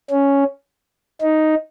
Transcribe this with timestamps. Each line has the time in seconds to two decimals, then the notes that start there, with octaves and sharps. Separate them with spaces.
0.11 C#4
1.21 D#4